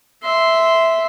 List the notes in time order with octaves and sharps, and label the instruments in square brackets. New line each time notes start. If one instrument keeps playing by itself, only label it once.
[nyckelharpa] E5 C6